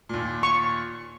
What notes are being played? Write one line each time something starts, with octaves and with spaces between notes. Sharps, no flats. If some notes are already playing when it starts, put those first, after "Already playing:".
D#2 A#2
C#6